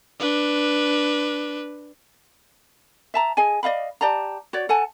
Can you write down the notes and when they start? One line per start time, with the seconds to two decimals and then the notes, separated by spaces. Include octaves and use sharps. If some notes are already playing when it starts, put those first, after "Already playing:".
0.19 D4 B4
3.14 E5 A5 A#5
3.37 G#4 D#5 G#5
3.63 D5 D#5 F5 B5
4.01 G4 D5 A5 A#5
4.53 F#4 C#5 D5
4.69 A4 F#5 G#5 A5